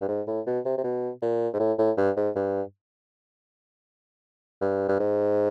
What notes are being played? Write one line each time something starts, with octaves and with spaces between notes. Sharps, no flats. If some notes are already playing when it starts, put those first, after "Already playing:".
G2
G#2
A2
B2
C3
C3
B2
A#2
G#2
A2
A2
G2
G#2
G2
G2
G2
G#2